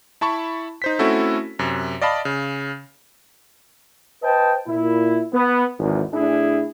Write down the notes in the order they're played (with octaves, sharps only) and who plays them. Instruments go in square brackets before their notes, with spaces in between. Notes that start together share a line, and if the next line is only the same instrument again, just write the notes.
[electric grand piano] E4 A5 B5 C#6
D#4 C5 B6
A3 C4 C#4 E4 F#4 A4
F#2 C3
D5 D#5 F5 A5 B5
C#3
[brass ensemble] B4 C5 D#5 G5 A5
A#2 E4
B3
G#1 E2
A2 D4 E4 G#4